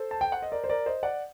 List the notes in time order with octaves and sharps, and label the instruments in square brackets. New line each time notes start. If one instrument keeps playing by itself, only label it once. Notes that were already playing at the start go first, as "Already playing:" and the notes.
Already playing: [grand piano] A4 C5
A5
G5
F#5
D#5
A#4 D5
C5
A#4 D5
C5 D#5
D5 F#5